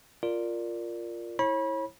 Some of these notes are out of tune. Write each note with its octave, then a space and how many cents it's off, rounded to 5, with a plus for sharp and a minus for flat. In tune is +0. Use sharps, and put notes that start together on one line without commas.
F4 +0 A#4 +0 D5 +0
E4 -10 C#5 -35 B5 -30